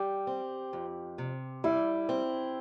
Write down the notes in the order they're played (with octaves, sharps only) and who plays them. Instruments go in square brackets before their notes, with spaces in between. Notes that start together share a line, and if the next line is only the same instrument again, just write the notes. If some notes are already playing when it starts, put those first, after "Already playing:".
Already playing: [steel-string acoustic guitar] G3 [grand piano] G4
[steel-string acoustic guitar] C4
F2
C3
[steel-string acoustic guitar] G3 [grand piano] E4
[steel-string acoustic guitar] C4